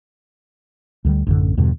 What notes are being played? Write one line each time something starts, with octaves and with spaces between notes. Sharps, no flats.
D2 D3 G3
A1 F#2 D3
E2 G2 B2 D3